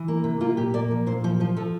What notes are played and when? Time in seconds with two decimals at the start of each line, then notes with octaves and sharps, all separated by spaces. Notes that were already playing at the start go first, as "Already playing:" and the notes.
Already playing: E3
0.08 A#3
0.24 C3
0.40 A#3 F4
0.57 A#2 G4
0.74 A#3 D5
0.91 F3
1.07 A#2 C5
1.24 F3 C5
1.40 F3 C5
1.57 F3 A4